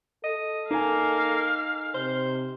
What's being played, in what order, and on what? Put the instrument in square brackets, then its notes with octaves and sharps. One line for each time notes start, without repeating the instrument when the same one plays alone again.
[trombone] A4 [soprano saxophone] D#5
[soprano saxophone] A#3 [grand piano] D#4 G#5 [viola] F5
[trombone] C3 [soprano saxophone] C5